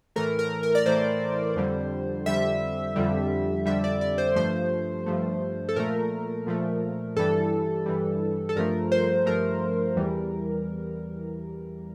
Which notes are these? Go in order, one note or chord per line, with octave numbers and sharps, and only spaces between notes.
A2 E3 A3 A#4
A#4
A#4
D5
A2 E3 A3 C5
F2 D3 G3
F2 D3 G3 E5
F2 D3 G3
F2 D3 G3 E5
D5
D5
C5
G2 F3 A3 C5
G2 F3 A3
A4
A#2 F3 A3 A#4
A#2 F3 A3
G2 E3 G3 A4
G2 E3 G3
A4
G2 F3 A3 A#4
C5
G2 F3 A3 A#4
E2 E3 G3